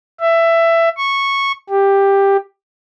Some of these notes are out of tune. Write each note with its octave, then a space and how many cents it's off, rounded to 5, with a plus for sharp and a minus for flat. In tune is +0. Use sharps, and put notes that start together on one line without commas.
E5 +15
C#6 -10
G4 +10